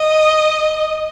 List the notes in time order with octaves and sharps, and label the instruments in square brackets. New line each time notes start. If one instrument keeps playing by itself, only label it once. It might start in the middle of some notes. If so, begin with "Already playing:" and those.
Already playing: [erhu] D#5